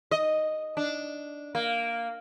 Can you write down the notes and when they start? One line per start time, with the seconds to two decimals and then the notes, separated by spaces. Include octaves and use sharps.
0.11 D#5
0.77 D4
1.55 A#3